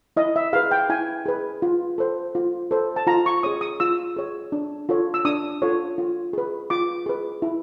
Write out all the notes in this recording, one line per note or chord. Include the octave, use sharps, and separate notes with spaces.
E4 D#5
E5
G#4 B4 F5
G5
E4 G#5
G#4 B4
F4
A4 C5
F4
A4 C5
A5
F4 A#5
C#6
G#4 C#5 D#6
D#6
F4 E6
G#4 C#5
D4
F4 A4 C#5
E6
D4 D#6
F4 A4 C#5
F4
G#4 B4
F4 D6
G#4 B4
E4